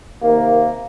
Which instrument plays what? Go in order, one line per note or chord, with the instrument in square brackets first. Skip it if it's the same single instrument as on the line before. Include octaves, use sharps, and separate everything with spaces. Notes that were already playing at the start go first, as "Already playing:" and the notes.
[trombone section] C3 D#3 A#3